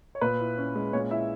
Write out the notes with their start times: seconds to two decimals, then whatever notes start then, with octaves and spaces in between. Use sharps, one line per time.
0.15 C#5
0.21 A#2 B4
0.40 E4
0.58 C#4
0.75 G#3
0.93 A#2 C#5
1.11 E4 E5